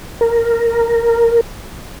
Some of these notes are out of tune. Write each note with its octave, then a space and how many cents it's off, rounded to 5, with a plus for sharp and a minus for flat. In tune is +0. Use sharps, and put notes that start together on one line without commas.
A#4 -5